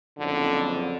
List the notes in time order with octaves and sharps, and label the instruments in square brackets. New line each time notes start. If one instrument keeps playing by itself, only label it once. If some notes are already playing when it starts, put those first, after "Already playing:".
[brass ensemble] F#1 F2 [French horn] D3